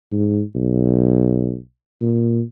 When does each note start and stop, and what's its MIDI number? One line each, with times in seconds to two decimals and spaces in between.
0.12 0.41 44
0.55 1.56 35
2.01 2.41 46